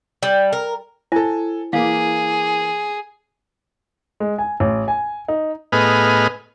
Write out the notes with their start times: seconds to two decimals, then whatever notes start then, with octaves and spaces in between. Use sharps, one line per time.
0.23 G3
0.53 A#4
1.12 E4 A4 C5 G#5
1.73 E3 A#3 G#4 F5
4.20 G#3
4.38 G#5
4.60 A1
4.88 G#5
5.28 D#4
5.72 A2 B3 G#4 B4 D#5 F6